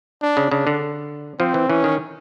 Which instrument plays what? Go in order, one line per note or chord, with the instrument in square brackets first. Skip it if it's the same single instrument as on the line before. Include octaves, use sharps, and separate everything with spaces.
[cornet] D4
[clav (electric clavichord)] C#3
[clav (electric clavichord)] C#3 [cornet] D4
[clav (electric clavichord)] D3
[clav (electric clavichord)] F3 [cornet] C4
[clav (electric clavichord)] E3
[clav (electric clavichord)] E3 [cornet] C#4
[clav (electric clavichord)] D#3